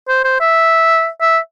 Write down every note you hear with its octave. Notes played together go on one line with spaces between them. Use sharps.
C5
C5
E5
E5